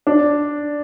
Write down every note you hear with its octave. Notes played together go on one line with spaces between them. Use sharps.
D4